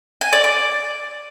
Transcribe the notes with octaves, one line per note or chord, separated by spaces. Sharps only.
G#5
D5
D6